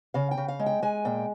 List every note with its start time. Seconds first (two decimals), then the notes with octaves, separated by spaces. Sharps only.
0.14 C#3 F5
0.31 G5
0.37 C#3
0.48 F5
0.59 G#3
0.66 G5
0.83 G#3 G#5
1.05 A#2 G5